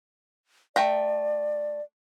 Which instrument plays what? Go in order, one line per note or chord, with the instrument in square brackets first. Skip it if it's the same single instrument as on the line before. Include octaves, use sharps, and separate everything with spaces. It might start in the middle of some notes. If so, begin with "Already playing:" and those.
[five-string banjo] A3 G5 A#5 [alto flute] D5